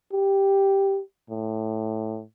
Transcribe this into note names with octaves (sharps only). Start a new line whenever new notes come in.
G4
A2